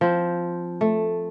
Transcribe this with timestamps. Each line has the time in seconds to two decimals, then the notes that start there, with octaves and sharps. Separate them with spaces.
0.01 F3 C4
0.81 A3